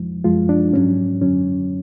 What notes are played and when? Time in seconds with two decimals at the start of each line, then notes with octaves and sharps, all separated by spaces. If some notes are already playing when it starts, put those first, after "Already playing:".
Already playing: F2 F3 G#3
0.24 F#2 F3 G#3 F4
0.49 D4
0.73 G#2 F#3 C#4
1.21 F#2 D3 F#3 C#4